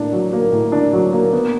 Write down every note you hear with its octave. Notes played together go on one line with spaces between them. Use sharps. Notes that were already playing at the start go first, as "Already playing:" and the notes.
Already playing: A2 A#3 D4
F#3
A#3
A2
D4
F#3
A#3
B3